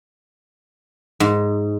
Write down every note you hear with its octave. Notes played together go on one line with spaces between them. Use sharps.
G#2